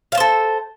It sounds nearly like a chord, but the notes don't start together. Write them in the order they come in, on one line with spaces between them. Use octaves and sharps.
F5 A5 C5 A4